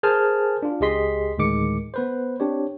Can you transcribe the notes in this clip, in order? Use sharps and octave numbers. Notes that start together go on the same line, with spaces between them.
G#4 A#4 C5 G#5 A5 F6
D4 F4
C#2 G4 G#4 D#5 C6 B6
D2 A2 D#3 G#3 D6 C#7
B3 B4 C5
C4 D4 G4 C#5